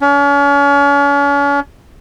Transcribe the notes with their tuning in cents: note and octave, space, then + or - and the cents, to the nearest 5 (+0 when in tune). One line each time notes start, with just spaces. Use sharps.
C#4 +40